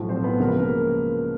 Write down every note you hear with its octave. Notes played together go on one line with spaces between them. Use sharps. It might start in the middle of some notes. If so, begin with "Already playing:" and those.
Already playing: B1 A2 F3
C4 C5
B3 B4
C#2 C#3 F3 A#4
B4
A#3 A#4